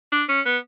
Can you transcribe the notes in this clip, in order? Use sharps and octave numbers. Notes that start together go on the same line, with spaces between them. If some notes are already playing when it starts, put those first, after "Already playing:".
D4
C#4
B3